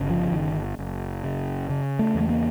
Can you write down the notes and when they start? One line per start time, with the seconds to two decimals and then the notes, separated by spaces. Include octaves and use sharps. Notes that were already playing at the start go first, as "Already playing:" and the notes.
Already playing: G1 C#3
0.10 F3
0.32 G1 D#3
0.79 F#1
1.24 C#3
1.70 C#3
1.99 A3
2.15 E2
2.20 A3
2.30 A#3